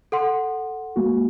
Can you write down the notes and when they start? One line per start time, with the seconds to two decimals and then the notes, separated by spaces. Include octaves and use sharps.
0.12 A4 F#5 C6
0.96 G#3 A#3 F#4